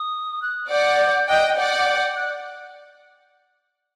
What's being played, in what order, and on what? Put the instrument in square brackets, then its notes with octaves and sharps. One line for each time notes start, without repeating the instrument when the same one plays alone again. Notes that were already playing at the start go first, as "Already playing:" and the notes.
Already playing: [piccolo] D#6
F#6
[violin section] D5 F#5 [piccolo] G6
[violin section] D#5 G5 [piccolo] F#6
[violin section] D5 F#5 [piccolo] G6
[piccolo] F#6